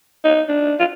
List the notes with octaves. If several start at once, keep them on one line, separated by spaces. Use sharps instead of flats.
D#4
D4
F4